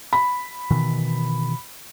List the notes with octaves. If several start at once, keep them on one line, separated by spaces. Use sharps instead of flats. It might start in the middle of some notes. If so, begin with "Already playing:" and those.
B5
B2 D#3 E3